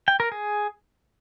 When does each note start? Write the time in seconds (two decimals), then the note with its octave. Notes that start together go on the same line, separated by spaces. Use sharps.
0.08 G5
0.20 A#4
0.32 G#4